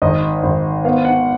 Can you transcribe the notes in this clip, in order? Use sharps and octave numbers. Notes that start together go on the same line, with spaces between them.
G#1 D#5
G#1
B3 F5
F#5